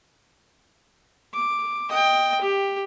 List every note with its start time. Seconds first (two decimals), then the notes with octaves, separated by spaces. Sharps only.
1.33 D6
1.90 D#5 G5
2.41 G4